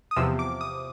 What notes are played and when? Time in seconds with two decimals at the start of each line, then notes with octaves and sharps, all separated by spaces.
0.11 D#6
0.16 E2 C3 F3 E6
0.39 D6
0.61 D#6